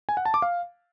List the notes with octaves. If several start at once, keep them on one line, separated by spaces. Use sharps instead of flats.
G#5
F#5
A5
D6
F5